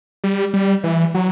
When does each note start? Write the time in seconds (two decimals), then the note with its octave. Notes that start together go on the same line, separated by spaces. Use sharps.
0.24 G3
0.54 G3
0.84 E3
1.15 F#3